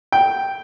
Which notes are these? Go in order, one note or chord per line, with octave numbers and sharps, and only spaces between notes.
G5